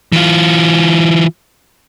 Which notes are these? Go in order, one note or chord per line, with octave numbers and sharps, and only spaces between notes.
E3 F4